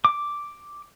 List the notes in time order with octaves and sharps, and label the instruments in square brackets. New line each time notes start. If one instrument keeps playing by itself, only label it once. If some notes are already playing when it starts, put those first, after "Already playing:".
[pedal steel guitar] D6